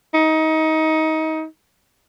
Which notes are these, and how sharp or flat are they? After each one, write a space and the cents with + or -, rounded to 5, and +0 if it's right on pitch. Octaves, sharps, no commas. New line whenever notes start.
D#4 +25